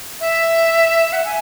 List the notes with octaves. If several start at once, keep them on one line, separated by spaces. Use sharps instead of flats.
E5
F#5
G#5